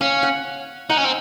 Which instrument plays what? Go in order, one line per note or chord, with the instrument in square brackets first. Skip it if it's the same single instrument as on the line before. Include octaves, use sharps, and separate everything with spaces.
[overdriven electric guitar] C#4 [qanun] F5
[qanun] F#5
[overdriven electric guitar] D#4 [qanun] F#5
[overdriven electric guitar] C#4
C4